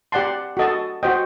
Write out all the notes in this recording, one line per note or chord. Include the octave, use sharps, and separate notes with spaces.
G4 D5 F#5 A5 C6
F#4 A4 D#5 A5
F#4 C5 D#5 G5